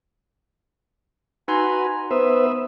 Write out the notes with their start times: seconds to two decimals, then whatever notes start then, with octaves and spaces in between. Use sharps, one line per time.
1.48 D#4 F#4 B4 G#5 A#5 C6
2.11 B3 B4 C5 E5 D#6